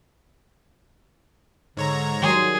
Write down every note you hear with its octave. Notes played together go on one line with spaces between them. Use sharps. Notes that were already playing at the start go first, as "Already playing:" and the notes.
G#2 D3 C#5 A#5
D#3 F#3 G3 G#4 C6